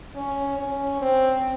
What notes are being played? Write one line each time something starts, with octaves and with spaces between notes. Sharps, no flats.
C#4
C#4
C4